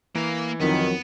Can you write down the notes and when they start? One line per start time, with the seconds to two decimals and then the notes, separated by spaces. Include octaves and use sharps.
0.15 E3 A#3 F5
0.61 F2 D#3 F#3 B3